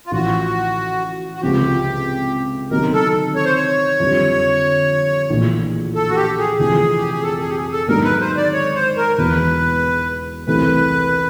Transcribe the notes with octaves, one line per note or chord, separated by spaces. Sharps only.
F4
A1 A2 F3 F#4
F#4
C#2 C3 F3 G4
C3 D#3 F#3 B3 A#4
A4
C#5
C5
C#5
F2 D3 G3
A#1 A2 E3
A4
F#4
G4
G#4
F1 F2 C3 E3 G#4
G4
G#4
A4
G#4
G4
G#4
A4
G#2 D#3 F#3 B3 D4 A#4
B4
C5
D5
C#5
C5
A#4
E1 E2 B2 B4
C2 C3 E3 A3 C4 B4